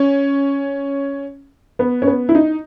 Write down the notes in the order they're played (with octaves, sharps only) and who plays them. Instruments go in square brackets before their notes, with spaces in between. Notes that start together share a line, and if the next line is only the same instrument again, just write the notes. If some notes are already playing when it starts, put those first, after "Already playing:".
Already playing: [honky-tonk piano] C#4
B3
C#4
B3
E4
D#4